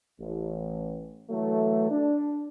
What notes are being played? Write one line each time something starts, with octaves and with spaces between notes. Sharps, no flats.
A1
E3 F#3 A3
D4